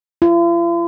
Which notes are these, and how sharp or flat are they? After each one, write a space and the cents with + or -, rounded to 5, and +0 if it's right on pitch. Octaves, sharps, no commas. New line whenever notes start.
F4 -45